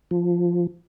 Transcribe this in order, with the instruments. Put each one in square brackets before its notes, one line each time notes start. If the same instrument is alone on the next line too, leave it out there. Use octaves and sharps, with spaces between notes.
[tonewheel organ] F3